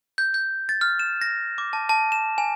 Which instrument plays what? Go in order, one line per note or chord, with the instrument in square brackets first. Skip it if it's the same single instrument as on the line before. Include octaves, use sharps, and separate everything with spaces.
[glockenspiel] G6
G6
A6
F6
E7
A#6
D6
A5
A5
E7
G#5